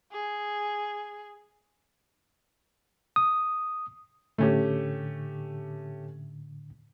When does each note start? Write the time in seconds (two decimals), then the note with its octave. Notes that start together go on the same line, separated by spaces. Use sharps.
0.12 G#4
3.16 D#6
4.38 A2 D3 A3 C#4 G4